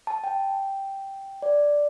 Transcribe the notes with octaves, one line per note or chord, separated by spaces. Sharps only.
A5
G5
D5